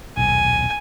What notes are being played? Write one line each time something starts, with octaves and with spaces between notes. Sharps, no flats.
D#1 B1 G#5